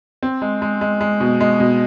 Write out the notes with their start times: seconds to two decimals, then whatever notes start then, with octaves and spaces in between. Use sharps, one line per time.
0.23 C4
0.42 G#3
0.62 G#3
0.81 G#3
1.01 G#3
1.20 B2
1.40 G#3
1.60 B2